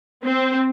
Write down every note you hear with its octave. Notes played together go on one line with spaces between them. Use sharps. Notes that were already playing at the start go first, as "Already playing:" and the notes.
C4